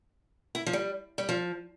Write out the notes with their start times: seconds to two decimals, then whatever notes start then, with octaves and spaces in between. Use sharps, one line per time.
0.55 E4
0.66 F3
0.73 G3
1.18 G3
1.29 F3